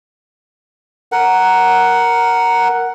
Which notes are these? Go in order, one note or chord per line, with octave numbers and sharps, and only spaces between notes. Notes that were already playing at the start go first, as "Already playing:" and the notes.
A#4 F#5